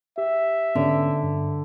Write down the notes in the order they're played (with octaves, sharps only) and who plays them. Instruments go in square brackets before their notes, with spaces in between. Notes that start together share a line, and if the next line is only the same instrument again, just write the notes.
[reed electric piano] G4 [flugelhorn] E5
[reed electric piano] G#2 B3 C#4 [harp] D3
[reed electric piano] G2